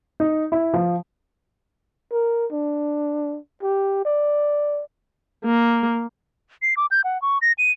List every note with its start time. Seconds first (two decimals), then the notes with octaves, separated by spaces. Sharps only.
0.20 D#4
0.52 E4
0.74 F3
2.12 A#4
2.52 D4
3.62 G4
4.05 D5
5.45 A#3
6.62 C7
6.77 D6
6.91 G6
7.04 F#5
7.22 C#6
7.42 A#6
7.58 D#7